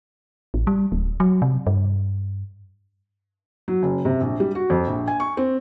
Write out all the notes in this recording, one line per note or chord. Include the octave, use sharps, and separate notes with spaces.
A1
G3
D1
F#3
C3
G2
F#3
F#1
C3
A#1
G3
F#4
F2
A#1
G#5
C#6
C4